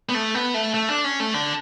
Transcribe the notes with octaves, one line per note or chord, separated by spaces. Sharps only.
B3
A3
B3
A3
A3
D4
C#4
A3
D3